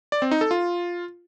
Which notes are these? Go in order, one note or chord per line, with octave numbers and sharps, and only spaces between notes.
D5
C4
D#4
A4
F4